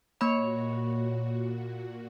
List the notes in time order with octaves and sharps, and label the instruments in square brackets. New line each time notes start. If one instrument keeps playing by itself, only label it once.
[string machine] A#2 F#4 [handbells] A#3 B5 [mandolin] C#5